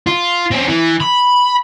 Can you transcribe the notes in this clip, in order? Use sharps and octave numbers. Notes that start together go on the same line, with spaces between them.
F4
C4 C#4
E3
B5